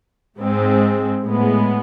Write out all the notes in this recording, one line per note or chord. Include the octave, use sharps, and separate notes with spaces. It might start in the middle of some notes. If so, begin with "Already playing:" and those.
G#2 G#3 C4
A2 G#3 B3